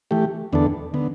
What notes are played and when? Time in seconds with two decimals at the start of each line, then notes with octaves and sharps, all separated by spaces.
0.11 E3 A3 G4
0.53 E2 D3 B3 D4 A4
0.94 D3 B3